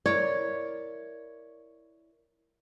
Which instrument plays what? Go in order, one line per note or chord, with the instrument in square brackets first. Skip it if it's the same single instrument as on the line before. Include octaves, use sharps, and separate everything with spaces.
[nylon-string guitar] E4 A#4 D5 [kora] C#5